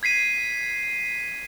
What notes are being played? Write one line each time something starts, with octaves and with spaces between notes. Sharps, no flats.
G#6 B6 C7 D#7